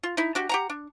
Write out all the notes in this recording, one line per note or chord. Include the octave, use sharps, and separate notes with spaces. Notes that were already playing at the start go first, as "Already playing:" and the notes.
F4
D#4 E4
D4 F#4 G4
G4 F#5 A#5
D4